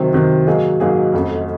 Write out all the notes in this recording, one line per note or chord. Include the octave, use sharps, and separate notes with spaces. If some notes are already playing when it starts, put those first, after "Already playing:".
Already playing: C3 D#3 F#3 C4
C3 D#3 F#3 C4
G#2 F#3 A#3 D#4 G#4
G#2 F#3 A#3 D#4 G#4
F1 F2 C#3